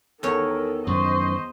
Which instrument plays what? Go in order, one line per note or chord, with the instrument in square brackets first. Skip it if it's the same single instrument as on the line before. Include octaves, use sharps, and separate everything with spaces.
[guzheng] E2 C#5 [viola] D#3 A4 [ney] A#4
[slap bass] F#2 D#3 E3 [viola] C5 D#5 [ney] C#6